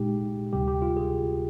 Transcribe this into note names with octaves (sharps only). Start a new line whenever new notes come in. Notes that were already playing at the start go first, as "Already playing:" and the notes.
Already playing: A#2 G#3 D#4 G4
D2 C3 G3 G4
G4
F4
G#4